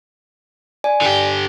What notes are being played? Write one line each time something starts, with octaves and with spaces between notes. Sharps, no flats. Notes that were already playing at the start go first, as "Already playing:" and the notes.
D5 G#5
D3 G4